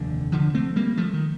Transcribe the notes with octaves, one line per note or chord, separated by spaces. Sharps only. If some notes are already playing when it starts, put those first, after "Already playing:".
Already playing: F1 D#2 D3
D3 F3
A3 C4
G3 A#3
F3 A3
D#3